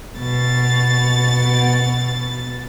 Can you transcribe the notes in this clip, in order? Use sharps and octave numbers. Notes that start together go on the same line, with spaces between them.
B2 A6